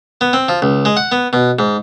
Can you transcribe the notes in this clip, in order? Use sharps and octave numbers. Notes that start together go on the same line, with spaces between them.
B3
C4
F3
C#2
G#3
F#5
B3
B2
G#2